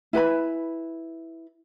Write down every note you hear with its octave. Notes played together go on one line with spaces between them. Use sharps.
E4 B4 G#5 B5